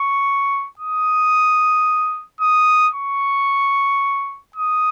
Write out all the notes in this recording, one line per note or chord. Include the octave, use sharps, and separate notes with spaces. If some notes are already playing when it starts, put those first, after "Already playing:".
Already playing: C#6
D#6
D#6
C#6
D#6